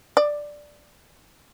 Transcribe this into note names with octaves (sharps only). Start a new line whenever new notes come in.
D5